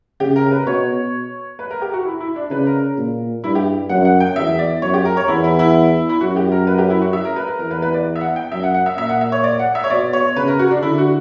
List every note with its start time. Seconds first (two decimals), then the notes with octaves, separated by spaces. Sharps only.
0.20 C#3 G4
0.36 A#4
0.51 B4
0.67 B2 C#5
1.59 B4
1.71 A#4
1.82 G4
1.93 F#4
2.05 E4
2.20 E4
2.36 D4
2.51 C#3 B4
2.67 A#4
2.98 A#2
3.44 G2 E4
3.55 G4
3.89 F#2 F#5
4.05 F#5
4.20 G5
4.36 E2 E5
4.59 D5
4.82 F#2 C#5
4.94 G4
5.05 A#4
5.17 C#5
5.28 E2 E4
5.44 E4
5.59 E4
6.09 E4
6.21 F#2 F#4
6.36 G4
6.52 A#4
6.67 B4
6.78 G4
6.90 E4
7.02 F#4
7.13 E5
7.25 A#4
7.36 B4
7.48 A#4
7.59 E2 A#4
7.71 B4
7.82 B4
7.94 D5
8.16 E5
8.21 F#5
8.36 G5
8.51 F#2 E5
8.63 F#5
8.74 F#5
8.86 E5
8.97 A#2 E5
9.09 F#5
9.21 E5
9.32 C#5
9.44 D5
9.59 F#5
9.75 E5
9.84 C#5
9.90 B2 D5
10.13 C#5
10.36 C#3 B4
10.48 A#4
10.59 F#4
10.71 D4
10.82 D3 E4
10.98 F#4